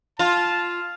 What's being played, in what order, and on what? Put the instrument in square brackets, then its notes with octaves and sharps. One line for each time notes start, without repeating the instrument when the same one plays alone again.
[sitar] F4 [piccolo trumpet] A5